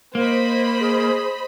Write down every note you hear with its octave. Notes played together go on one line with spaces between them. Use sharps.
A#3 C5 D#5 B5
G#4